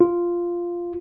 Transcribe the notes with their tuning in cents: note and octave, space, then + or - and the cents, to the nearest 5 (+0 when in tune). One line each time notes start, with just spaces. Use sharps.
F4 -5